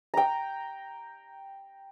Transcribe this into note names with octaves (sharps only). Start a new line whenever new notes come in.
G5 A#5